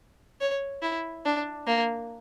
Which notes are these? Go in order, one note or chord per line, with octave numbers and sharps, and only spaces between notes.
C#5
E4
D4
A#3